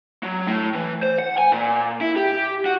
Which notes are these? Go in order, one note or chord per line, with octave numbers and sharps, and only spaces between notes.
F#3
A2
E3
C5
F#5
G#5
A#2
E4
G4
F#4